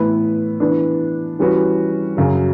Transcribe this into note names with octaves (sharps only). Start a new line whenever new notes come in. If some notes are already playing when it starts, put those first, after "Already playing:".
Already playing: A2 E3 B3 E4 B4
E3 B3 D4
E3 G3 C#4 F#4 B4
F#2 C#3 F#3